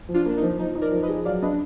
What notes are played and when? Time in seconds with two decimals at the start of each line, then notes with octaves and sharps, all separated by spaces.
0.09 F3
0.14 D4 F4
0.26 A#3 D4
0.37 D#4
0.42 F3
0.58 F3 D#4
0.75 D#4
0.82 A#4 D5
0.91 F3
1.03 B4 D#5
1.09 G#4
1.25 F#3 D5 F5
1.42 D4 B4 D#5